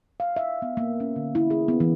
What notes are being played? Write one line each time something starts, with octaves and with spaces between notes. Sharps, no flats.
F5
E5
B3
A#3
C#4
D3
E4
G#4
B3
E3